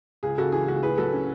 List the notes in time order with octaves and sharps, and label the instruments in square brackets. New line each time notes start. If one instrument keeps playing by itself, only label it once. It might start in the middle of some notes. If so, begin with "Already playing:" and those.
[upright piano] C#2 G#4
C#3 F#4 A4
E3 G#4
C#2 F#4
A2 G#4 B4
F#3 F#4 A4
C#4